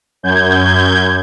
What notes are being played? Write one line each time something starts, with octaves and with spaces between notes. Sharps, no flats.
F#2 G6 G#6